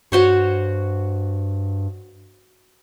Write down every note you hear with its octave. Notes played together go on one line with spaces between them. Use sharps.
G2 F#4 C5 C#5